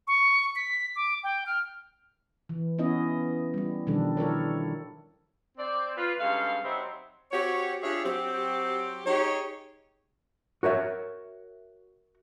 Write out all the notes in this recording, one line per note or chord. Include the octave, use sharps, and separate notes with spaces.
C#6
B6
D6
G5
F6
E3
B3 C#4 E4 D#5
G3 E4
B2 D#3 F3 G3 D4 A4
E4 A4 A#4 C#5
C4 D5
F4 B4
G2 C#3 G#3 A4 F5
F#3 G3 C4 D#4 C5 E5
C4 F#4 G4 C#5
D4 F4 G4 G#4 C#5 E5
F#3 C4 G4
D#4 G4 G#4 C#5
F#4 A#4 C#5 E5